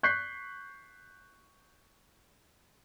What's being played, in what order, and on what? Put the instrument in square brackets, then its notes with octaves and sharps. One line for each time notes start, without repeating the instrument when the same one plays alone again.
[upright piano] C#6 F#6 G6 B6 C7